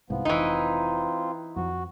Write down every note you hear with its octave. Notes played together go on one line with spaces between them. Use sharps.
C2 G#2 F3 B3
F1 E3 C4 D#4 F4
F2 F3 F#4